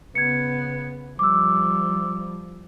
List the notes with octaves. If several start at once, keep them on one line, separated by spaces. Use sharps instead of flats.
C#3 B3 G#6 C#7
F3 G3 D6 E6